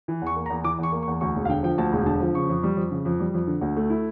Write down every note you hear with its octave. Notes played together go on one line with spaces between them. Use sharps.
E3
E2
C#6
A#3
A#5
E2
E3 D6
E2
C#6
A#3
C#6
E2
D2 C#6
E1
F5
D3 G5
F3 G5
D2 A5
E1
D3 A5
F3
C#3 C#6
F2
G3
F2
C#3
F2
G3
F2
D3
D2
A3
E4